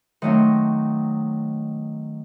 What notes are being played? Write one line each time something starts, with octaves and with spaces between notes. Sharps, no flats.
D#3 F#3 A3 A#3 C4